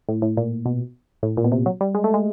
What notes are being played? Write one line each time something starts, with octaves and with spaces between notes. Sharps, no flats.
A2
A2
A#2
B2
A2
A#2
B2
C3
F#3
G3
G#3
A3
G#3